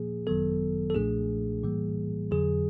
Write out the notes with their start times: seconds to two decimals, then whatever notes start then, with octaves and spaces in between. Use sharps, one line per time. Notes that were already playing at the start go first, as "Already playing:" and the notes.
Already playing: A#2 F3 A#3 G#4
0.27 G#1 F#2 D#3 F#3 B3 A4
0.90 A4
0.94 B1 A#2 F3 A3 D4 G#4
1.63 A2 E3 G3 A#3
2.31 F2 D3 F#3 G#4